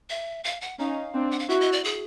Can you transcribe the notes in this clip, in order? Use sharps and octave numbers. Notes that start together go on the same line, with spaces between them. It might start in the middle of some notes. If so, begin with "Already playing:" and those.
E5
F5
F#5
C#4 D#4 F5
C4 D4
F#5
F5
E4 F#4 E5
D#5
D5
G#4